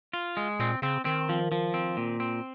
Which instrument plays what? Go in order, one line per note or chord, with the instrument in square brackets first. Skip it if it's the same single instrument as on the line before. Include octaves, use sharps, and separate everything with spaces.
[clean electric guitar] F4
G#3
[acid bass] A#2 [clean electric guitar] C4
[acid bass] C#3 [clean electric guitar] C4
[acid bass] D#3 [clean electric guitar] C4
[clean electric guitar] F3
F3
C4
A#2
C4